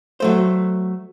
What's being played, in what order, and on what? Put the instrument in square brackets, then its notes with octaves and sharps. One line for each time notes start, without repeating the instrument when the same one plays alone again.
[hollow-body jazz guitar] F#3 A3 C5